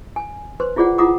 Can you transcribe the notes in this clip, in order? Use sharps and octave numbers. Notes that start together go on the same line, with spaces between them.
G#5
B4 C5 C6
E4 F4 G#4 C5 D5 F#5
E4 F4 F#5 A#5 D6 D#6